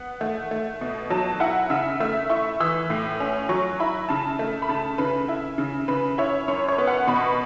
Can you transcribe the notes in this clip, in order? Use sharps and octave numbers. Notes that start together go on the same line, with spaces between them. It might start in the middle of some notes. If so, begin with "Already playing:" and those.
Already playing: B3 F#5
A3
A3
B2
F#3 A5
E4 F#5
C#3 E5
A3 E5
E4 C#6
E3 E6
A2
C#4
F#3 C#6
E4 B5
C#3 A5
A3
B5
C#3 A5
C#3 B4
E4
C#3
C#3 B4
E4 C#5
F#2 C#5
C#5
B3
F#5
B2 B5
C#6
B5